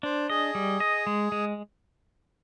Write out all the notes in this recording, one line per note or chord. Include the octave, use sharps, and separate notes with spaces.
D4 C5
G#4 D#5
G3
D#5
G#3
G#3